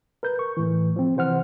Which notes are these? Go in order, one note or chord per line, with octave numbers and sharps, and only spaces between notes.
A#4 B4 G6
C#6
A2 E3
F3 C4
C3 E3 C5 F#5 F6